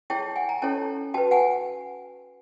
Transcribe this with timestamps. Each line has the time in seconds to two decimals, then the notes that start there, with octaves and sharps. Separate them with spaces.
0.10 E4 G#4 C#5 G5 A5
0.36 F#5 G#5
0.49 G#5 A#5
0.62 C#4 E4 A4 C#5 G5 A5
1.14 F#4 B4 G5 A5
1.31 F#5 G#5